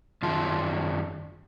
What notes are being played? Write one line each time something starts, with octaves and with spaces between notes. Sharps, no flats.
F#2 D#3 F4 A5